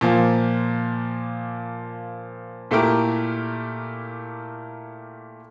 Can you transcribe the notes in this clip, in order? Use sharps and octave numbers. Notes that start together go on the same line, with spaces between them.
A#2 F3 A#3
A#2 A3 E4 G4 A#4